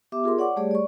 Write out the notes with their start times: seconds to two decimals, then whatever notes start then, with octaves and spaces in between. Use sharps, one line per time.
0.12 B3 G4 E5 D6
0.24 F4 G#4 A#4 C6
0.38 C#5 D5 F#5 C#6 D6
0.56 G3 A3 G4 G#4 C#5 D5
0.71 D5 C#6